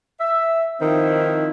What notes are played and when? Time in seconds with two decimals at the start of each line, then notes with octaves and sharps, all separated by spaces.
0.20 E5
0.81 D#3 F3 C4 D#4 E4